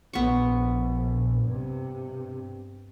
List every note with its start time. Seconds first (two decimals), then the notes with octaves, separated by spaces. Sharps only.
0.13 A#1 B3 C#6
1.47 G2 C3